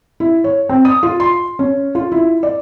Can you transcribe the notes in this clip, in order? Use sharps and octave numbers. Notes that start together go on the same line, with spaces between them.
E4
C#5
C4
D#6
F4
C6
C#4
F4
E4
D5